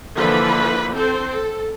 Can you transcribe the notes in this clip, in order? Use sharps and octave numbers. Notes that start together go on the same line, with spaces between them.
D3 E3 F3 A#3 B4 B5
C4 A4 C5
A4